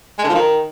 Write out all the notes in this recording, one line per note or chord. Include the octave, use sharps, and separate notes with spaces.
G#3
D3
F3
D#3